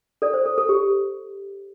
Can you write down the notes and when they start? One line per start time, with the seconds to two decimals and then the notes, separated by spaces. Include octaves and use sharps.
0.22 A4 D5
0.34 C5
0.46 A4
0.58 A4
0.69 G4